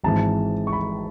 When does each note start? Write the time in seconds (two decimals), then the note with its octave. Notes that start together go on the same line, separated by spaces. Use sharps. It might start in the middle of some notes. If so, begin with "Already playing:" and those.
0.04 G#1 G#2 E3 A5
0.67 C#6
0.73 B5